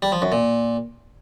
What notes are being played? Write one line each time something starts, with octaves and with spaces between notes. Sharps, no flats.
G3
F3
F#2
A#2